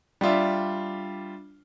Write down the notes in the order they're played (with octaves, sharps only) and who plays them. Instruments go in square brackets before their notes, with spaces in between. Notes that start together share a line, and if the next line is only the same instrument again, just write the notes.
[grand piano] G3 D4 F4 E5